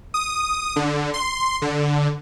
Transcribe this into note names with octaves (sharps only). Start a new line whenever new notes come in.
D#6
D3
C6
D3